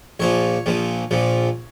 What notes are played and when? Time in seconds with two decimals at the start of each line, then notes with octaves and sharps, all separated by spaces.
0.20 A#1 A#2 F3 C#5
0.66 A#1 A#2 F3
1.11 A#1 A#2 F3